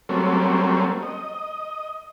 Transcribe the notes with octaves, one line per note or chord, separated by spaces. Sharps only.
F#3 G3 A3 A#3 C4 C#4
D#5